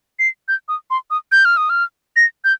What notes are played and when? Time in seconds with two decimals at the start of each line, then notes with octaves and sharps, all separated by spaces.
0.19 C7
0.48 G6
0.68 D#6
0.90 C6
1.11 D#6
1.32 G6
1.45 F6
1.57 D#6
1.70 F6
2.16 A#6
2.44 G6